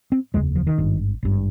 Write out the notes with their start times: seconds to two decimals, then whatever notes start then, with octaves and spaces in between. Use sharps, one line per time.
0.12 C4
0.34 F1 D#2 C#3 G#3
0.56 F3
0.67 D#3
0.78 G#1 G2
1.23 G#1 G2